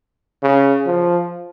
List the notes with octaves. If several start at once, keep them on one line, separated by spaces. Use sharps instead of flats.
C#3
F3